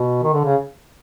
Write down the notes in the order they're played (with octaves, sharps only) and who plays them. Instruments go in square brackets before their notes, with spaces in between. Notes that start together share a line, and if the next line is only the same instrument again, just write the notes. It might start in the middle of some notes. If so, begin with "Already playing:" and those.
Already playing: [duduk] B2
D#3
D3
C#3